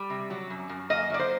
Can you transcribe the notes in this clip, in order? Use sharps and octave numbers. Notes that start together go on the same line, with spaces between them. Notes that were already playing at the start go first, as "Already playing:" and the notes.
Already playing: G3
C3
F#3
F#2
F#2
A#3 D#5
F#3 D5
C5